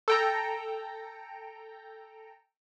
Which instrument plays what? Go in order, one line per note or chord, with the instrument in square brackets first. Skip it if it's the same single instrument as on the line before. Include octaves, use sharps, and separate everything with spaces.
[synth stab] A4 G5 A#5